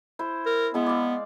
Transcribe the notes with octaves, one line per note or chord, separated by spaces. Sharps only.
E4 C5
A#4
G#3 B3 E4
D5 F5